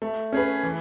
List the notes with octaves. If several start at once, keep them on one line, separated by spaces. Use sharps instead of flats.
A3
C#4 G#4 B4
E3